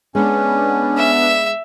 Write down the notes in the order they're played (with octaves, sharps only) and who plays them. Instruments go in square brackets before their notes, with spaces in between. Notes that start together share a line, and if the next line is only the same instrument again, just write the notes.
[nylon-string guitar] G#3 [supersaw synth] B3 D4 [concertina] C#4
[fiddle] E5